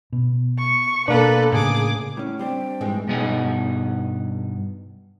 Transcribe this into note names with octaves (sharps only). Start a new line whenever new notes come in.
B2
C#6
B2 A#3 D4 A4 B4
A2 C#3 G#4 D6
A2 C#4
G3 C4 D4 G5
G#2 E3 G#3
G2 B2 B3 D#4 G#4